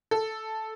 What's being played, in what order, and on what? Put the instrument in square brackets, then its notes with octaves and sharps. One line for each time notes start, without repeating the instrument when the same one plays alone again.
[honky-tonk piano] A4